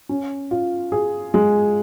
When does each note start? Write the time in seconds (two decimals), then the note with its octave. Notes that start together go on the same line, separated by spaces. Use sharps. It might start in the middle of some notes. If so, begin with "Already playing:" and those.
0.09 C#4
0.51 F4
0.92 G#4
1.34 G#3